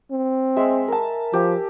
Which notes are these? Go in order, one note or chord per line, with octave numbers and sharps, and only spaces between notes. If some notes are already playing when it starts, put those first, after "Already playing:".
C4
G#3 E5
A#4 A5
F3 G4